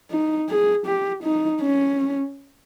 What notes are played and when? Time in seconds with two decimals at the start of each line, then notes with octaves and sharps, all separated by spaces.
0.11 D#4
0.49 G#4
0.86 G4
1.23 D#4
1.61 C#4